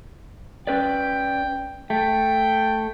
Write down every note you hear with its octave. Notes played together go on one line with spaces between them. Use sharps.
C#4 B4 D5 G5
A3 G5